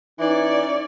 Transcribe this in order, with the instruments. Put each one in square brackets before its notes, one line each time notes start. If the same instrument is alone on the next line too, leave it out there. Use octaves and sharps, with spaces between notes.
[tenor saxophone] E3 [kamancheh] C#4 D5 [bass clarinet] D#4